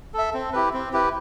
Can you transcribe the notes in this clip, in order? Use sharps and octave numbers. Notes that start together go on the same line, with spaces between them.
A4 E5
C4
E4 G4 B4
C4
E4 G4 B4